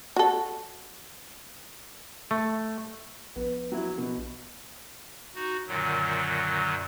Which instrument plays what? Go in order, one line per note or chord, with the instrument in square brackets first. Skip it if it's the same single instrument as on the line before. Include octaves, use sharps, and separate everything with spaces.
[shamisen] F#4 A4
[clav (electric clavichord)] A3
[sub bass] A#1 [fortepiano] B3
[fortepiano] F#3 E4
B2
[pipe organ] D#4 F#4
F#2 A#2 D3 D#3 F#3